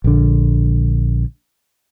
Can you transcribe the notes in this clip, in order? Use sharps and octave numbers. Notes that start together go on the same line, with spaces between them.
A#1 D3